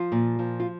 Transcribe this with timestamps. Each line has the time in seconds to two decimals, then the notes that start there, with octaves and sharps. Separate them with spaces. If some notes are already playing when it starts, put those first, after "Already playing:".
Already playing: F3 F4
0.12 A#2
0.39 F3
0.60 F4